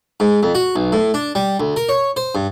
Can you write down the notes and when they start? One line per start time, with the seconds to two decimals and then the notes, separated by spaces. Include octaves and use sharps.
0.20 G#2
0.43 F2
0.55 F#4
0.76 B1
0.92 A2
1.14 D4
1.35 G3
1.60 D2
1.76 A#4
1.89 C#5
2.17 C5
2.35 G2